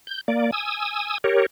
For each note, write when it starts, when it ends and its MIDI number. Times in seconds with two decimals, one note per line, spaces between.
0.07 0.21 91
0.28 0.51 58
0.28 0.51 74
0.52 1.18 80
0.52 1.18 87
0.52 1.18 88
1.24 1.46 67
1.24 1.46 70
1.24 1.46 73